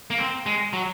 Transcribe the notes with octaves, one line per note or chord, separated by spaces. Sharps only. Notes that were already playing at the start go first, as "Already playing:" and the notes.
A#3
C4
G#3
F#3